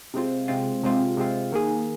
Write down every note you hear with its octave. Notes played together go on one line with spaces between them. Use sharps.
C3 G#3 C4 F4
C3 G#3 C4 F4
C3 G#3 C4 F4
C3 G#3 C4 F4
D#3 A#3 G#4